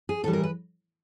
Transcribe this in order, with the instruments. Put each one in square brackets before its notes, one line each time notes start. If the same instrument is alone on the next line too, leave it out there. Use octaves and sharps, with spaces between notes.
[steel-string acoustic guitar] G#4
A2 E3 G3 A4
A#4
B4